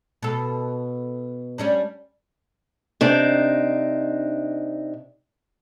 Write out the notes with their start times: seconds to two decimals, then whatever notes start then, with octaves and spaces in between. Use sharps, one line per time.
0.22 B2 A4
1.58 G3 C#4 D4
3.01 C3 D4 D#4